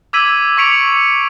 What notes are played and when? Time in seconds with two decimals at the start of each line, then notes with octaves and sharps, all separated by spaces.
0.13 D6 E6 G#6 B6 D#7 F#7
0.57 C#6 D6 B6 C#7 D7 F7